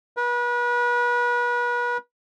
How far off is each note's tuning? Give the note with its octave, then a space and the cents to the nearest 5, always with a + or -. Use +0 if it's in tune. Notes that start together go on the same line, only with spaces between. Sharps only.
B4 -35